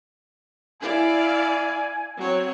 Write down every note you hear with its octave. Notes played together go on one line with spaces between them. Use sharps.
E4 D5 F5 G#5
F#3 C4 C#5